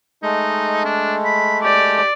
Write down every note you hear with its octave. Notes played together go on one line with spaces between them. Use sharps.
G#3 A3 D#4
D4
B5
G4 D5